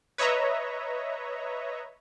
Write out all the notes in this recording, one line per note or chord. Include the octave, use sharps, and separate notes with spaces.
B4 C#5 D#5 E5 A#5